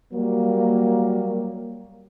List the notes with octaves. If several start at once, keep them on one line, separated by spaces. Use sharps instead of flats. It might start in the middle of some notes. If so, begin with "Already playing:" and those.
F#3 G3 A#3